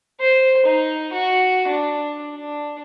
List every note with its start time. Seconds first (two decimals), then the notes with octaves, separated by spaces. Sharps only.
0.20 C5
0.66 D#4
1.12 F#4
1.68 D4
2.35 D4